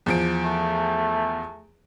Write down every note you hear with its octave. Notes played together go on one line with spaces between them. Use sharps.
E2 F3 D7
A3